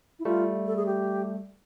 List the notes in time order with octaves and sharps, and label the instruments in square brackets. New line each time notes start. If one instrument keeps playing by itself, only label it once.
[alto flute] E4
[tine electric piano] G3 A3 [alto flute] F4
[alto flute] A4
G#4
G4